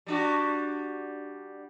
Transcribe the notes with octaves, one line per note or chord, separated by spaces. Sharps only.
G3 D4 F#4